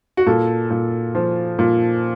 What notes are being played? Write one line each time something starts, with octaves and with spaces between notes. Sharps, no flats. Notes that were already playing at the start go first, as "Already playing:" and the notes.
F#4
A#2 A4
A#2
F3
A#2